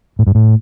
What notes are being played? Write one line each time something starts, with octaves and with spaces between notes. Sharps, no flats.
A2
G2
A2